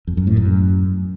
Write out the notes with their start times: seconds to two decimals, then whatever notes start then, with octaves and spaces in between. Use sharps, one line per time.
0.07 F2
0.17 F#2
0.27 A2
0.37 F#2